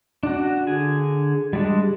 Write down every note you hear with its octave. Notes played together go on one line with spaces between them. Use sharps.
D4 F#4
D3 G#4 G#5
G3 G#3 D4